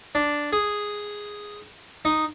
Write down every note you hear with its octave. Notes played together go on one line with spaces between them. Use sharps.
D4
G#4
D#4